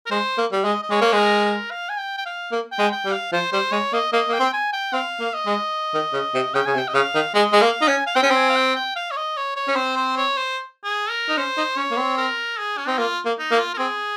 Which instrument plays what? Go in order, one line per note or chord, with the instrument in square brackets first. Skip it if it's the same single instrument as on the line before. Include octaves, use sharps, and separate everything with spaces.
[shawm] A#4
[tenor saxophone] G#3 [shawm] C5
[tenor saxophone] A#3
G3
[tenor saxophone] G#3 [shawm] D#5
[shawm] D#5
[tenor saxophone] G#3 [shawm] C#5
[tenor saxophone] A#3
[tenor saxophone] G#3 [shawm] A#4
[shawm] A#4
F5
G#5
G5
G5
F5
[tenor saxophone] A#3
[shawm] G5
[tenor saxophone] G#3
[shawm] G5
[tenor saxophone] G3
[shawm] F5
[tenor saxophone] F3 [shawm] C5
[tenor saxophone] G3 [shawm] C5
[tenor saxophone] G#3 [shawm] C#5
[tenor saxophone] A#3 [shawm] D#5
[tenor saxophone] A#3 [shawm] D#5
[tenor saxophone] A#3 [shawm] G5
[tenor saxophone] C4
[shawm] G#5
G5
[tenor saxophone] C4 [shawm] F5
[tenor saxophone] A#3
[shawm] D#5
[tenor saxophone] G#3
D#3
C#3
C3
[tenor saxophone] C#3 [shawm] G5
[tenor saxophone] C#3 [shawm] G#5
[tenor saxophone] C3
[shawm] G5
D#5
[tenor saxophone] C#3 [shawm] F5
[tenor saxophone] D#3
[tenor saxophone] G#3 [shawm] D#5
[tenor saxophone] G#3
[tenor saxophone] A#3 [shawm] F5
[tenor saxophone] D#4
[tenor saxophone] C#4 [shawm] G#5
[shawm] F5
[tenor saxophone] C4 [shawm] G5
[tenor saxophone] C#4
C4
[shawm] G#5
F5
G5
G5
F5
C#5
D#5
C#5
C#5
[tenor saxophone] C#4
[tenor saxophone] C4 [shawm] C5
[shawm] C5
C#5
C5
G#4
A#4
[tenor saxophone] D#4
[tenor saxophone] C#4 [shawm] C5
[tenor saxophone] D#4
[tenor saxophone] C#4 [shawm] C#5
[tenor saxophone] A#3
C4
[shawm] A#4
G#4
C#4
[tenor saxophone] C4 [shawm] D#4
[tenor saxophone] A#3 [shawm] F4
[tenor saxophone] A#3
[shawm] D#4
[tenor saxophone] A#3
[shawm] F4
A#4
[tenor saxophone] C4 [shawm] G#4